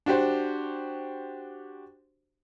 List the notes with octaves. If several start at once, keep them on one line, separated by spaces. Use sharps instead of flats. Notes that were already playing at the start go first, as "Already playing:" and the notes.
D4 F#4 G4 C5